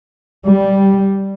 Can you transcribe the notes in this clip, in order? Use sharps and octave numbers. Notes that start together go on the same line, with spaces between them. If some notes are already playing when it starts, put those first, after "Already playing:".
G3